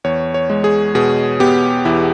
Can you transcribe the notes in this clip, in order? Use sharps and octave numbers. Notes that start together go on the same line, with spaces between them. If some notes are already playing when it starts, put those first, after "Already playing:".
E2 C#5
C#5
G#3
G#4
B2 G#4
B3 G4
E2 E4